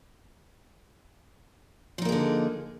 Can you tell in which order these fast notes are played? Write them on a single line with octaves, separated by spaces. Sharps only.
F3 D#4 A#3 G#4 D3